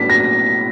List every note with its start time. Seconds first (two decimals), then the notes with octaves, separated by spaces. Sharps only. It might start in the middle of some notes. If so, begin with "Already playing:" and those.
Already playing: A2 F#3 B3 D4 B6
0.10 A#6